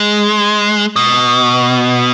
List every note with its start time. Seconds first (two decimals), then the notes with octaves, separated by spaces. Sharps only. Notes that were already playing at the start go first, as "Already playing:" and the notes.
Already playing: G#3
0.96 B2